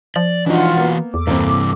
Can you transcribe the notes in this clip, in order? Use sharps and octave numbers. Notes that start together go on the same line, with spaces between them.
F3 D5
E3 D4 D#4 F4 F#4 F#5
A#3 B3
E2 A4 D6
G2 C3 E3 A#3 C4